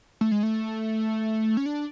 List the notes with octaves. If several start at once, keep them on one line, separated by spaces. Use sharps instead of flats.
A3
G#3
A3
C#4
D4